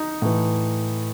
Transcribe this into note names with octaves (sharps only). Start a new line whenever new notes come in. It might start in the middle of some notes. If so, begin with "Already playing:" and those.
Already playing: D#4
A2 E3